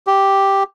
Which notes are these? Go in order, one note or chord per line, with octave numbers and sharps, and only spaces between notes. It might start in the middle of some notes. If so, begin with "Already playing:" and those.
G4